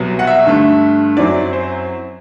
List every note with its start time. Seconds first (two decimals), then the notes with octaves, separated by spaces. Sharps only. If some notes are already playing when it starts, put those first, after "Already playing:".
Already playing: C2 B2 F#3
0.19 F#5
0.27 E5
0.45 G2 D3 A3
1.17 F#2 F#3 C4 E4 D5
1.53 C5